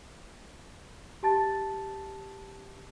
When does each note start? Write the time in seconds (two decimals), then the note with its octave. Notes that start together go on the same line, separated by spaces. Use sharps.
1.23 G4 A5 A6